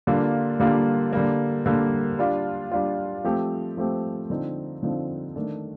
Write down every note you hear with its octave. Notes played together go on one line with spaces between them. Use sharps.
D3 G3 A#3 D4 F4
D3 G3 A#3 D4 F4
D3 G3 A#3
D3 G3 A#3
G3 D4 F4
G3 D4 F4
F3 A3 C4 G4
F3 A3 C4 G4
D3 F3 C4 D#4
D3 F3 C4 D#4
D#3 A3 D4